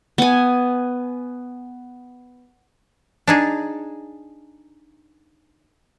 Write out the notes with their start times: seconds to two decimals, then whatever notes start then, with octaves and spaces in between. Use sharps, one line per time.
0.18 B3 G#5
3.27 D4 D#4 G#4